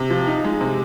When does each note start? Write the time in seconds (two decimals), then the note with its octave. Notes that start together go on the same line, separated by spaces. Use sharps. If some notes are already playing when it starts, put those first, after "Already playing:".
Already playing: C3
0.10 F3
0.27 D#4
0.45 G#3
0.61 C3